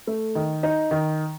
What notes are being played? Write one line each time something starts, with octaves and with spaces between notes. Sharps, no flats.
A3
D#3
D#4
D#3